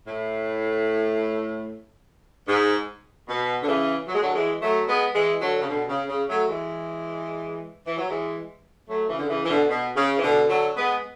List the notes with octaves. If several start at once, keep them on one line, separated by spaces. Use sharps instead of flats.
A2
G#2
B2
D3
C#3 E3
F#3
G#3
D3 F#3
E3 G#3
F#3 A3
G#3 B3
E3 G#3
D3 F#3
C#3
B2 D3
C#3
C#3
F#3 A3
E3 G#3
E3
F#3
E3 G#3
F#3 A3
C#3 E3
D3
C#3 E3
E3
B2 D3
B2
C#3
E3
B2 D3
D3 F#3
G#3 B3